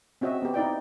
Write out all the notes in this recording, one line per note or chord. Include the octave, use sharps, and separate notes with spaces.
C4 C#4 F#4 D#5 E5
B3 G4
D#4 E4 D5 G5